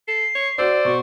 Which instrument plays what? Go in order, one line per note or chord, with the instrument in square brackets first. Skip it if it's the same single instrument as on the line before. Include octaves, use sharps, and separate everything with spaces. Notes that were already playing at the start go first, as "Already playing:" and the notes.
[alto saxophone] A4 [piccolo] C7
[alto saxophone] C#5
[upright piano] F#4 E6 [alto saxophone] C5 [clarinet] D5
[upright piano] B2 [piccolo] C#6